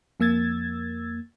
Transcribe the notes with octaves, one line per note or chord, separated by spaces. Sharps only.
F2 A#3 E6 G#6 A6